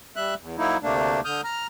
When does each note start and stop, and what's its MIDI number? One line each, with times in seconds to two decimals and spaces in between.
0.16 0.34 55
0.16 0.34 76
0.16 0.34 90
0.40 0.56 40
0.58 0.77 54
0.58 0.77 58
0.58 0.77 63
0.58 0.77 64
0.83 1.20 38
0.83 1.20 48
0.83 1.20 57
0.83 1.20 58
0.83 1.20 62
1.25 1.41 50
1.25 1.41 87
1.25 1.41 89
1.25 1.41 91
1.44 1.67 82
1.44 1.67 89